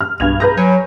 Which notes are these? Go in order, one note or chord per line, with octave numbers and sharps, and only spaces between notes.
F6
B1 G2 G#6 F7
G#4 B4 A#5 G6 A#6
F#3 C#5 G#5